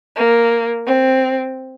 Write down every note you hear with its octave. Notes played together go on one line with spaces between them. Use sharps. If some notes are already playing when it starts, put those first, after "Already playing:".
A#3
C4